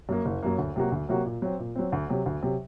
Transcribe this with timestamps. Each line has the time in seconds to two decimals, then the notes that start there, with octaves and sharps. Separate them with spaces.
0.09 F#2 F#3 A#3
0.25 F#1
0.43 F#2 F#3 A#3
0.58 D2
0.76 C3 F#3 A#3 F#4
0.92 D2
1.09 C3 F#3 A#3 F#4
1.25 A#2
1.42 F#3 C4
1.59 A#2
1.75 F#3 C4
1.92 D2
2.10 C3 F#3
2.26 D2
2.43 C3 F#3